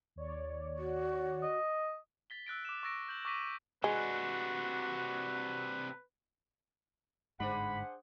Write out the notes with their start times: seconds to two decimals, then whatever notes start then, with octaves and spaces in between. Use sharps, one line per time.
0.16 D#2 C#5 D5
0.78 F#4
1.43 D#5
2.30 A6 B6 G7
2.46 E6 F#6 A6 D7
2.65 D6 E7
2.83 C#6 E6 A6 A#6 D7
3.09 G6 F#7
3.25 C#6 D6 F#6 A#6 B6 D#7
3.84 C3 G#3 D4 F#4 B4
7.40 G1 G#2 D4 G#4 C5 F#5 B5